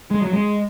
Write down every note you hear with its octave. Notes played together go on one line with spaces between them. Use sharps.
G#3
F#3
G#3